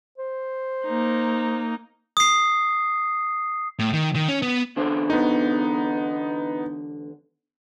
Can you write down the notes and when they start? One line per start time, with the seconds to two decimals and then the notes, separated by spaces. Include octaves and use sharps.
0.18 C5
0.85 A#3 D#4
2.17 D#6 C7
3.79 A2
3.93 D#3
4.15 D#3
4.29 C#4
4.42 B3
4.77 E2 D3 C5
5.10 B3 D#4